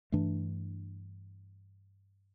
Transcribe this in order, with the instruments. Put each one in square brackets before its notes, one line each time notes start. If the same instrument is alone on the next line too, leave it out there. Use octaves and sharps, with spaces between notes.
[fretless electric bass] G2 E3 A3 D4